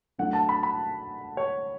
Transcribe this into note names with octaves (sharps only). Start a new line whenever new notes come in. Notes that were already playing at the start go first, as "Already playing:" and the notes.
F#3 A3 D4 F#5
A5
B5
B5
C#5